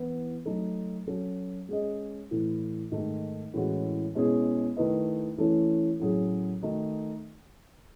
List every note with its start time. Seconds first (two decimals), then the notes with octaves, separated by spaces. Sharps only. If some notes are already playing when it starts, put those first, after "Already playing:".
Already playing: E3 B3 E4
0.46 F#3 A3 D#4 A4
1.07 F#3 C#4 F#4 A4
1.69 G#3 C#4 G#4 D#5
2.31 A2 E3 A3
2.92 G#2 D#3 A3
3.54 A2 E3 G#3 C#4 F#4
4.15 B2 G#3 C#4 E4 G#4
4.76 D#3 A3 E4 B4 D#5
5.38 E3 A3 C#4 E4 A4
6.00 A2 F#3 C#4 G#4
6.62 D#3 A3 D#4 F#4